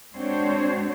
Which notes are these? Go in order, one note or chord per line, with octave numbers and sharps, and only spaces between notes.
G#3 C4 D4 F#4 C5 C#5